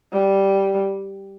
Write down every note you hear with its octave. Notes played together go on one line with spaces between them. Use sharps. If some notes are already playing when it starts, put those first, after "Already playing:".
G3